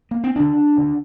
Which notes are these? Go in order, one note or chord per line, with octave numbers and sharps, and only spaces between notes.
A#3
C4
D2 D3 D4
D2 D3